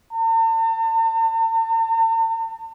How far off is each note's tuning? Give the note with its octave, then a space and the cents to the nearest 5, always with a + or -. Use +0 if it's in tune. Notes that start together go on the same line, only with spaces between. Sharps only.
A5 +45